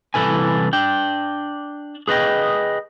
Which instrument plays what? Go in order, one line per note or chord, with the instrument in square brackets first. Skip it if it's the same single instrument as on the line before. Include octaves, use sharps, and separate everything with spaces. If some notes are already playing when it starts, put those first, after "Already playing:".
[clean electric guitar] C2 E3 F#3 A4 B4 G#5
D4 G5
G#4 B4 D5 D#5 G5